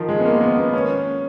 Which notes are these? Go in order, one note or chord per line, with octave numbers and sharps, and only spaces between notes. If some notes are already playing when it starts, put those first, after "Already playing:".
Already playing: D#3 F3
G#3
B3
A#3
B3
B3
C#4